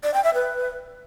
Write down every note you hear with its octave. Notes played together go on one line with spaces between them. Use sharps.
D5
G5
E5
B4